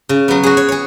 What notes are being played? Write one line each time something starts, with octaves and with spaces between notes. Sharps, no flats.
C#3
F#3 B3
F#4 G#4
C#5
G#4 C#5